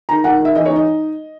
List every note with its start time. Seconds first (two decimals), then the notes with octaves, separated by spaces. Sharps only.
0.09 D#3 A#5
0.24 D#3 F#5
0.40 D#3
0.45 E5
0.55 E3 D#5
0.65 D#4 C#5
0.76 D#5